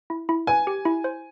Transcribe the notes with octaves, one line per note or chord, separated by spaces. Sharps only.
E4
E4
B4 G#5
G4
E4
C5